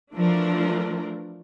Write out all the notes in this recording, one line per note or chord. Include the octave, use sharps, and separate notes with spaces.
E3 F3 A3 D4 F4 A#4